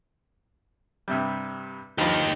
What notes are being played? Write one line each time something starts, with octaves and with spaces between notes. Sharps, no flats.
G2 C3 G3
G2 F3 D#4 G4